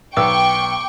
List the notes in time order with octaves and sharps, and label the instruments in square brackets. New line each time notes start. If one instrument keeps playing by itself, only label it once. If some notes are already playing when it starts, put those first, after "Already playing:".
[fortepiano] B1 B3 E6 [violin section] G5 C#6 [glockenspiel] D6